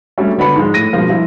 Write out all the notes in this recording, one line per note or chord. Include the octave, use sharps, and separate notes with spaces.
F#3 G3 A3 C#4 D4
D2 B3 D4 B5 C#7
G#2 F3 G#3
A2 A#6 D#7
G2 B2 F3 G#3 A#3
F3 G3 E4